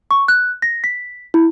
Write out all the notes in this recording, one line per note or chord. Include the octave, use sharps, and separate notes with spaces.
C#6
F#6
A#6
B6
E4